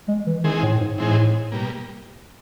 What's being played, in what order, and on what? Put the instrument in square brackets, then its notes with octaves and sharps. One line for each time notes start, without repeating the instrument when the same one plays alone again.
[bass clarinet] G#3
E3
[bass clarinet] D#3 [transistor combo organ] E3 G#3 C4 D#4 G#4
[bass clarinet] A2
G#2
[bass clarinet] A2 [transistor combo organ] E3 G#3 C4 D#4 G#4
[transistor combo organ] B2 G3 A#3